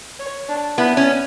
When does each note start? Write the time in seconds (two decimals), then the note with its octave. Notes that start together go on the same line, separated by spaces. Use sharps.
0.19 C#5
0.49 D4
0.78 B3 E4
0.97 C#4